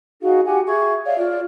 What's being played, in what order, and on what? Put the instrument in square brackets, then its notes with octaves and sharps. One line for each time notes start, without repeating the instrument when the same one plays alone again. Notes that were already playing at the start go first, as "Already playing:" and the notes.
[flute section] D#4 F#4 G#4 F5
F#4 G4 F#5 G#5
G#4 E5 C#6 G#6
C#5 D5 E5 F5
F4 D5